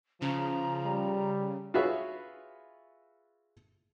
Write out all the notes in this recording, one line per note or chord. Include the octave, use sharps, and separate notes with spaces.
C#3 F3 A#5
G3
F4 F#4 G#4 B4 C#5 E5